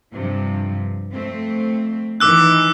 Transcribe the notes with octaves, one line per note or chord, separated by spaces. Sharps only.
G2 C3 F3
F2 A3 C4
D#3 E3 D6 E6 F#6